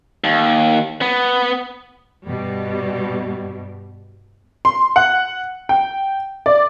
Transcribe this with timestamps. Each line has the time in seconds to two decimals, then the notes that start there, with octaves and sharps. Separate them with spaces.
0.24 D#2
1.01 B3
2.25 G2 B2 G3
4.65 C6
4.96 F#5
5.69 G5
6.46 D5